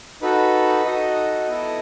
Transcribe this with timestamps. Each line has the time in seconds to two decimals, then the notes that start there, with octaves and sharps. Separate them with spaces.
0.22 D#4 F#4 A4 B4
0.85 D#4 F#4 A4 D#5
1.48 B3 E4 A4